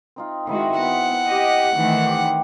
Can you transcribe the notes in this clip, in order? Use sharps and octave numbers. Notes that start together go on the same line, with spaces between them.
C4 D#4 F4
D#3 G#3 C4 E4 F#4
B3 F#5
G4 D#5
D#3 E3 A3
G4 G5 G#5